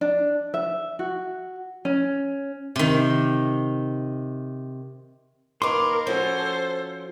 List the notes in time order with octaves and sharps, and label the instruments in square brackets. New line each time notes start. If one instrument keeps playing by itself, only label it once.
[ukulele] D4
E5
F#4
C#4
[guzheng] C3 D#3
[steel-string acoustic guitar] D#2 B4 [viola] A#4 [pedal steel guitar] C6 D6
[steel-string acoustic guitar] F3 C#4 F#4 [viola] A4 C5